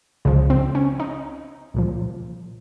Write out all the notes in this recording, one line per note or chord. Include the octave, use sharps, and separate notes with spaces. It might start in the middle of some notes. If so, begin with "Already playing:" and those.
C#2 C#3 F3
C4
C#4
D#4
C2 A#2 F3